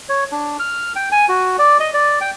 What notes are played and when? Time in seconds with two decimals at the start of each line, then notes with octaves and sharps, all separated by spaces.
0.09 C#5
0.32 D4
0.60 F6
0.96 G5
1.12 G#5
1.29 F#4
1.59 D5
1.80 D#5
1.94 D5
2.21 G5